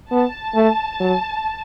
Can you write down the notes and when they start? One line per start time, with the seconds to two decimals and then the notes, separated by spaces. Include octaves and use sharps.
0.11 B3 A5
0.55 A3
1.00 F#3